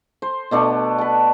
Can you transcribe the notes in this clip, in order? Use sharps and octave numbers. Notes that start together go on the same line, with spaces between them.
C5
B2 A3 D4 F#5
B4 A5